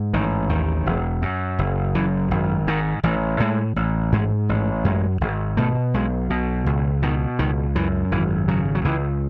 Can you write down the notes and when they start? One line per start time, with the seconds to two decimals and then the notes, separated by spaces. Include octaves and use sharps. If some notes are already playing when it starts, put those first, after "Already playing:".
Already playing: G#2
0.13 A1 D#3
0.49 D#2 D#3
0.86 E1
1.22 F#2
1.59 F#1
1.95 F#2 E3
2.31 G#1
2.67 G#2 D#3
3.03 A1 E3
3.40 A2 G#3
3.76 A1
4.12 G#2 G#3
4.49 A1
4.85 F#2 G#3
5.21 G#1
5.57 B2 A3
5.94 B1 G#3
6.30 B2
6.66 C#2
7.02 B2 D#3
7.39 C#2 D#3
7.75 F#2 E3
8.12 G#1 E3
8.48 C#3 F#3
8.75 F#3
8.85 C#2 E3